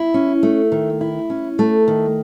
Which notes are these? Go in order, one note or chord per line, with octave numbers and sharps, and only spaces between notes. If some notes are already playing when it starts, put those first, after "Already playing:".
Already playing: E4
C#4
A3
D#3
E4
C#4
A3
D#3